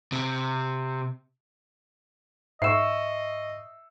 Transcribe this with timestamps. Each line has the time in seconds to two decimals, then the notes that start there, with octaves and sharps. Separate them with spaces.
0.12 C3
2.62 G#2 D#5 E5 C#6 E6 C7 E7